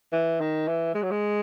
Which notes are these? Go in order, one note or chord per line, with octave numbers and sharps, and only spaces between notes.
E3
D#3
E3
G#3
F#3
G#3